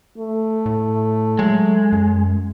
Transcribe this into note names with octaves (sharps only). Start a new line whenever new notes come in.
A3
A2
F#3 G#3
F#2